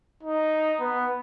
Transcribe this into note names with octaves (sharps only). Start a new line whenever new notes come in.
D#4
B3